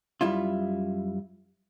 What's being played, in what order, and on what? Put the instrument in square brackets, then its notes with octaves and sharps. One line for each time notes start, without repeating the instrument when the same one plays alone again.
[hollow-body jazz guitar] F#2 G3 E4 F4